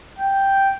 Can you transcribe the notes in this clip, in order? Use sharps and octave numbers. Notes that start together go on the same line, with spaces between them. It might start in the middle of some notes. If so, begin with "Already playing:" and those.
G5